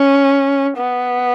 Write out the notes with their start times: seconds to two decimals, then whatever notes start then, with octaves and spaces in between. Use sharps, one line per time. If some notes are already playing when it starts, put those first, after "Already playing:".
Already playing: C#4
0.78 B3